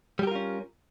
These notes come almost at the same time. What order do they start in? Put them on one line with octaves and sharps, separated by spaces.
G3 G4 A#4 F4 C#4